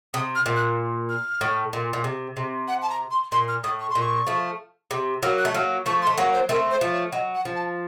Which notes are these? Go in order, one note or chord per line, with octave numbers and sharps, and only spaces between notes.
C3 D#6
F6
A#2
F#6
F6
A2
A#2
A#2
C3
C3
F#5
A5
A#5
C6
A#2 C6
F6
A2 D#6
C#6
C6
A#2
C#6
F3 A3
C3
F#3 A#3 F6
F#6
A3
F#3 A#3 F6
F3 A3 C#6
C6
A3
F#3 A#3 C#5
C5
A3 C4 A#4
C5
F3 A3
C#5
F#3 D#5
F#5
F3
A5